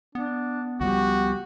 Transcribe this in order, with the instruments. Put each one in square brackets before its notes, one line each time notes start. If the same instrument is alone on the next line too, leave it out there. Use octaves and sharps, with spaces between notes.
[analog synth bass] B3 [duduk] D4
[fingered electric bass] C#2 F3 G3 [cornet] F#4 [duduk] G4